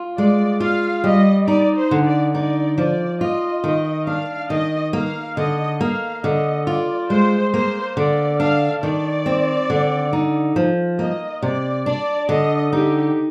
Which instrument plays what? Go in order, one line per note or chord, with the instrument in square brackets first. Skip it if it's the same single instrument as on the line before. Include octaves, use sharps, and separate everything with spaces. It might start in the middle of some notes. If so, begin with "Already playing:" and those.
Already playing: [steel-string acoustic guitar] F4
[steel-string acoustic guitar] G#3 [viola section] D5
[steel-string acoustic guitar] F4 [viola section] F5
[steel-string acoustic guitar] G3 [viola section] D#5
[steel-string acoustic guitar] D#4 [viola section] D5
[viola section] C5
[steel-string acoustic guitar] D3
[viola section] D5
[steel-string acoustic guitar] D#4 [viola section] D5
[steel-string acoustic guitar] F3 [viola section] D5
[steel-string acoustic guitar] F4 [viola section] D#5
[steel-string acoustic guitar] D#3 [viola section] D#5
[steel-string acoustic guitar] D4 [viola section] F5
[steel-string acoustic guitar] D#3 [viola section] D#5
[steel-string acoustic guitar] A#3 [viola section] F5
[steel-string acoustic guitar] D3 [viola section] D#5
[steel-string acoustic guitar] A#3 [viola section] F5
[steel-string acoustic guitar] D3 [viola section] D#5
[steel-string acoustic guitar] F4 [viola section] D5
[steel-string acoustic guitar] G#3 [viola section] C5
[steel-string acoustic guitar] A#3 [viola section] C5
[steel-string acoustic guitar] D3 [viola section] D5
[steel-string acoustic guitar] D4 [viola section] F5
[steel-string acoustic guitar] D#3 [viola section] D5
[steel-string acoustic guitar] C4
D3
D#4
F3
[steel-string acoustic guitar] A#3 [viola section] D#5
[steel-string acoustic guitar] C3 [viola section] D5
[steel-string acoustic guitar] D4 [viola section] D5
[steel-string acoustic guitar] D3 [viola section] D#5
[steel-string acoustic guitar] D#4 [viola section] G4